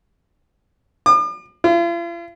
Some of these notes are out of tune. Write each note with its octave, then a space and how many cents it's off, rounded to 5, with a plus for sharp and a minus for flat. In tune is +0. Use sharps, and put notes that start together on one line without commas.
D6 +45
F4 -45